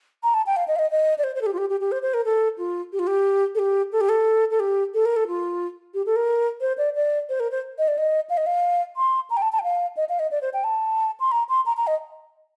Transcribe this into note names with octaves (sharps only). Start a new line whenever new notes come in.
A#5
A5
G5
F5
D#5
F5
D#5
D#5
D5
C5
C5
A4
G4
F4
G4
G4
G4
C5
C5
A#4
A4
F4
G4
F4
G4
A4
G4
A4
G4
A4
A4
G4
A4
A#4
A4
F4
G4
A4
A#4
C5
D5
D5
C5
A#4
C5
D#5
D5
D#5
F5
D#5
F5
C6
A#5
G5
A5
A5
G5
F5
D#5
F5
D#5
D5
C5
G5
A5
C6
A#5
C6
A#5
A#5
D#5